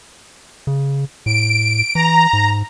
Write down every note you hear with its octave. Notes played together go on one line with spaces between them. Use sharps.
C#3
A2 D7
E3 A#5
G#2